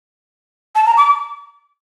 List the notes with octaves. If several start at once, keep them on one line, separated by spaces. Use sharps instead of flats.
A5
A#5
D6